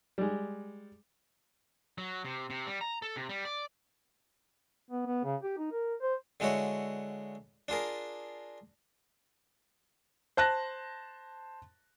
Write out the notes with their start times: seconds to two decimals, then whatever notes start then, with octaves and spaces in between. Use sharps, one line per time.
0.18 G3 G#3
1.98 F#3
2.25 C3
2.50 C3
2.67 G3
2.81 A#5
3.02 A4
3.16 C3
3.29 G3
3.45 D5
4.90 B3
5.06 B3
5.24 C#3
5.43 G4
5.58 D#4
5.71 A#4
6.02 C5
6.40 D3 G#3 E4 F#4 C#5
7.68 D4 F4 G#4 A#4
10.37 C5 A5 F#6 A#6